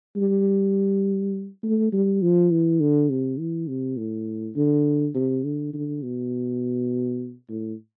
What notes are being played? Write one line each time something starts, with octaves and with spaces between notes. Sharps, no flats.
G3
A3
G3
F3
E3
D3
C3
E3
C3
A2
D3
C3
D3
D3
B2
A2